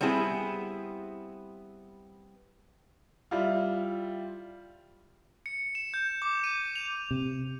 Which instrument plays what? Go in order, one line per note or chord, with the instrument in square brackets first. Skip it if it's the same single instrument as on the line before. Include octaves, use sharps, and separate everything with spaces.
[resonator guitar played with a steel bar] G3 B3 C4 E4 G#4
[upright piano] G3 E4 F4
[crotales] C#7
E7
G6
D6
D#7
F7
[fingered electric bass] C3